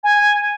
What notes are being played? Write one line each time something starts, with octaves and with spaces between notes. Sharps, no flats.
G#5